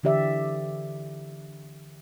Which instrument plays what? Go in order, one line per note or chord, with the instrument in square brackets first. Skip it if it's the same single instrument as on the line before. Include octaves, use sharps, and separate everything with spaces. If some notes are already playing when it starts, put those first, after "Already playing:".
[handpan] D3 E3 G4 D5 E5